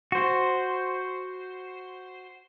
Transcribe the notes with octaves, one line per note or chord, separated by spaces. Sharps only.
F#4 C5